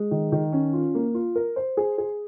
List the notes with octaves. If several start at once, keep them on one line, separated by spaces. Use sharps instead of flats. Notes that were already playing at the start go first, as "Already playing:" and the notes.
Already playing: G#3
D#3
D#3
C#4
F4
A#3
F4
A#4
C5
G#4
G#4